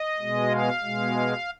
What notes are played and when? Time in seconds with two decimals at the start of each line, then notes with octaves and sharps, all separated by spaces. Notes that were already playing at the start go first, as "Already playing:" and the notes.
Already playing: D#5
0.18 B2 G#3
0.50 F5
0.83 B2 G#3